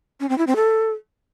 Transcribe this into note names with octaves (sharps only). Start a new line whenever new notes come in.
C#4
C4
E4
C4
A4